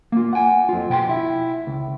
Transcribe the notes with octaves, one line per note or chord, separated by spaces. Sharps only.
A#3 F4
F#5 G#5
F2 F4
B2 G5 B5 C6
E4
C#2